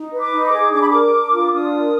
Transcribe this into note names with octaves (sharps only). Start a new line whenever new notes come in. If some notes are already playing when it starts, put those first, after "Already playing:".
Already playing: D#4
B4
D6
D#4
D6
G#4
D4 D6
B5
A#4 D6
D4
F4
D4 D#6
A#4